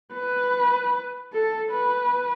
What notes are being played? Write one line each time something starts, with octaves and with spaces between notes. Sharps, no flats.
B4
A4
B4